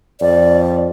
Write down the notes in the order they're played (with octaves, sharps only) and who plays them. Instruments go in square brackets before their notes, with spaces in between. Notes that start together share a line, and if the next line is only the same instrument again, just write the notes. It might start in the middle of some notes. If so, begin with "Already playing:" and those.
[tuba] F2 [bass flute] D5